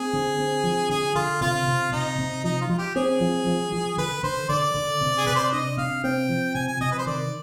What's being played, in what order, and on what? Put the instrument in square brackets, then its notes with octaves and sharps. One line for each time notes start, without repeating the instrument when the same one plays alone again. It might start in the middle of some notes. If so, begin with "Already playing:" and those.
Already playing: [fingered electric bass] C4 [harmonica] G#4
[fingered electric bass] D3
C4
F3
[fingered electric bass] D3 [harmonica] G#4
[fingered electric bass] D3 [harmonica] F4
[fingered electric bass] C3 [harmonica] F4
[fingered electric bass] C3
[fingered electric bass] C3 [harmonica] D#4
[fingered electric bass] C3
[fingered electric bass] F3 [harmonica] D#4
[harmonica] F4
[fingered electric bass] F3
[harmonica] G4
[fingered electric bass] C4 [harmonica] G#4
[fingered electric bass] F3
F3
F3
[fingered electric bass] D3 [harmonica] B4
[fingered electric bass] D3 [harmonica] C5
[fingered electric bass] D3 [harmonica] D5
[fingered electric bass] D3
C3
[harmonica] G#4
[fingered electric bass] C3 [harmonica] B4
[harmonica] C5
D5
[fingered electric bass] D4 [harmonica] D#5
[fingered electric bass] C3 [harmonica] F5
[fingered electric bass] C4 [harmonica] G5
[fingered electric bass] F3
[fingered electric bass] C3 [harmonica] G#5
[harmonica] G#5
[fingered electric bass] C3 [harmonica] D#5
[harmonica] B4
C5
[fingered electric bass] D#3 [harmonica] D5